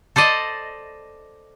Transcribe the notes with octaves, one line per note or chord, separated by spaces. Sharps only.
A4 C5 D5 D#5